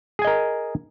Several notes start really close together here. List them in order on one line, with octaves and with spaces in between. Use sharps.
G#4 G#5 D#5 A#4